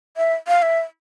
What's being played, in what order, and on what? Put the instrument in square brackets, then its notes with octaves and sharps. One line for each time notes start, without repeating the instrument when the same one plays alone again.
[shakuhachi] E5
F5
E5